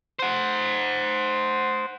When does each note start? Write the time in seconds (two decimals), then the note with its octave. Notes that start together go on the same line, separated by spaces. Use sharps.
0.19 C5 F#5